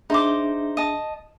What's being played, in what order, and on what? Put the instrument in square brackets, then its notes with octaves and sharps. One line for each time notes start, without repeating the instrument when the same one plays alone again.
[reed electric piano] D4 G#4 E5 [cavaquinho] D#4 C5 D6
[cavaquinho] D#5 A5